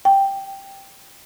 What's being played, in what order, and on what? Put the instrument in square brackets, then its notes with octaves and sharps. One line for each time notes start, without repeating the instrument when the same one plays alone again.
[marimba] G5